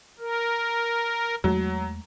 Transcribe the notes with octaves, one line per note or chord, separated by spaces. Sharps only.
A#4
E2 F#3 G#3 A3